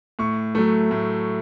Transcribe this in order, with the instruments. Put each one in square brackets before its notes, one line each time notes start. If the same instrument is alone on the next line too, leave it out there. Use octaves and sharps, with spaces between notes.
[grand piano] A2 C#6
F#3 A3
A2